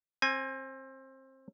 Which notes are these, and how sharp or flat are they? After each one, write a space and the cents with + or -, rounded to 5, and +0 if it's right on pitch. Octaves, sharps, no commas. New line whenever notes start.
C4 +25 G#5 -10